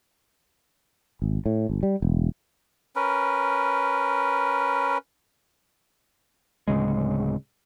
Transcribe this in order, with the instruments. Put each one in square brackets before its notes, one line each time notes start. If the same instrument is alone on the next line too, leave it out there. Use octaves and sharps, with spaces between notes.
[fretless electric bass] G#1
A2
G1
G3
E1
[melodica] C#4 A#4 B4
[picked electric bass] D1 G#1 C#3 G#3